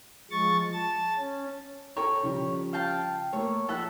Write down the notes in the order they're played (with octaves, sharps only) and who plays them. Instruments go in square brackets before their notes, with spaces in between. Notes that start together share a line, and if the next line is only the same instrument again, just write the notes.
[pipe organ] F3 G#3 C#6 A6
A5 A6
C#4
[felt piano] A4 G5 A#5 [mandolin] C#5
[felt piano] C#3 F3 G3
[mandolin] F5 G5 A5
[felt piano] A3 A#3 [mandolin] C#5
[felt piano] F3 F#6 [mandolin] A4 E5 F#5